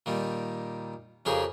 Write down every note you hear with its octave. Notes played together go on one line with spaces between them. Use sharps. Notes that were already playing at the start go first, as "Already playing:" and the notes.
A#2 D#3 G3
F2 C#3 G4 G#4 A#4